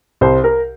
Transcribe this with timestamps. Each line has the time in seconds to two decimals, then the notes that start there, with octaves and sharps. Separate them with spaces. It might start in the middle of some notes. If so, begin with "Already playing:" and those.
0.21 C2 C5
0.44 A#4